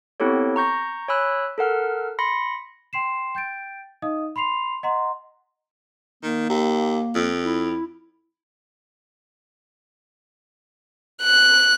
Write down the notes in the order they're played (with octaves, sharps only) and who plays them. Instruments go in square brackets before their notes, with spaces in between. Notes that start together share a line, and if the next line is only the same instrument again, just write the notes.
[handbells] B3 C4 E4 G4 A4 C#5
A#5 C#6 G6 A#6
C#5 G#5 B5 E6 F#6
A4 A#4 F#5 F6
B5 C6 A#6 C#7
[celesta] G5 C6 C7 E7
G5 G6 A6 D7
D#4 D#5 F5 D#6
B5 C6 C7 F7
D#5 F#5 A#5 C6
[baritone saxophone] D#3 [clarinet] A#3
[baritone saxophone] D#2
F2
[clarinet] E4
[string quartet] F#6